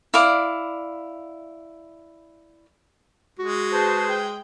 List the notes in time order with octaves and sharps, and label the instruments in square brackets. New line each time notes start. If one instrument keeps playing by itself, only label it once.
[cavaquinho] E4 D5 F5 D6
[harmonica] G#3 [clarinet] F#4
[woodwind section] G#4 B4 C5 [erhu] A5
[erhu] G5